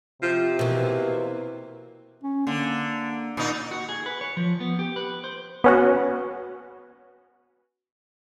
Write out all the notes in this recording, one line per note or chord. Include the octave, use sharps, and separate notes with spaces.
C3 F3
B2 E3 A#3
C#4
D3 A#3
A#2 D#4
F#4
G#4
B4
C#5
F3
B3
G4
B4
C5
B3 C#4 F#4